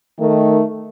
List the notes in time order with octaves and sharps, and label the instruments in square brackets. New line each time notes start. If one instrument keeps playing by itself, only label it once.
[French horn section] D#3 A3